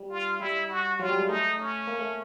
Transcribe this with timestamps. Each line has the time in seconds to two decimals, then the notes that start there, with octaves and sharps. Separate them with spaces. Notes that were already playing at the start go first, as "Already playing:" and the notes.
Already playing: G3
0.10 F4
0.40 G3 E4
0.69 F#4
0.99 F#3 F4
1.09 G3
1.19 G#3
1.28 A3 D#4
1.59 C#4
1.87 A#3
1.99 A3